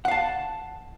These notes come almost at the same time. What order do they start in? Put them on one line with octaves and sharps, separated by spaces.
F#5 F5 A5